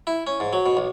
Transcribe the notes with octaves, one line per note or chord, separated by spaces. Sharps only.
E4
C#4
G#2
F#3
B2
B1